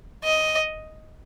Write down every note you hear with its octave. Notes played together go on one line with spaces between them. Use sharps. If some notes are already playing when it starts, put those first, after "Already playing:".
D#5